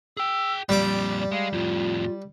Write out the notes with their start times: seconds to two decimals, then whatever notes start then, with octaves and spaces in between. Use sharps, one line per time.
0.17 G#4 G5 E6
0.69 F2 A#2 G3 D5 D6
1.32 G#3 F5
1.53 F2 A2 F4